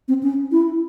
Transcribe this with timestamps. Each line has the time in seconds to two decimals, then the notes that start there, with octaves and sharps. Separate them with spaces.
0.08 C4
0.23 C#4
0.52 E4